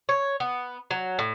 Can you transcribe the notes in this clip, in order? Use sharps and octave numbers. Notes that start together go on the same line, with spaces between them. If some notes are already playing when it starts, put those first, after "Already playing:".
C#5
B3
F#3
A2